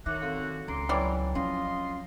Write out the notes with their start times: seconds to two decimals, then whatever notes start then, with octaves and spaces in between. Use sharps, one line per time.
0.06 F#2 D3 D#3 F#4 E5 D6 F#6
0.22 C4 A4 F5
0.68 C#2 A#5 C6 D6
0.89 E3 F#3 G3 C#5 G#6
1.35 F3 C#4 F4 D#5 C6